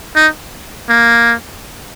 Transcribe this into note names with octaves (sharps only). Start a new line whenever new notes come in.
D#4
A#3